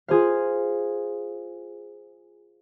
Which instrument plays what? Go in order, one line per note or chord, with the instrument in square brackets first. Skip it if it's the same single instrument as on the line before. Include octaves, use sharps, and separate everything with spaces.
[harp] F4 G#4 C5 F5